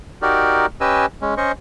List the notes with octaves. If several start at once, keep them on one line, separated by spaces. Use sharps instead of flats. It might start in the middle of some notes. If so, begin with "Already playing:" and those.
D#4 F#4 G4 A#4 D5
C#4 G4 B4 D#5 G#5 E6
G#3 C#4
C#4 C5 D#5 C#6